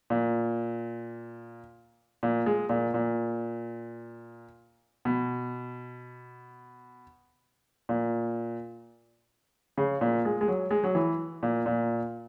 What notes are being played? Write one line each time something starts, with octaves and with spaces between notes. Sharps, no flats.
A#2
A#2
G#3
A#2
A#2
B2
A#2
C#3
A#2
G#3
G#3
F#3
G#3
F#3
E3
A#2
A#2